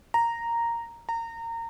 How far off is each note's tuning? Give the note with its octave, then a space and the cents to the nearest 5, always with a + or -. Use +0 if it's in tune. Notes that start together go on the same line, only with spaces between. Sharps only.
A#5 -5
A#5 -25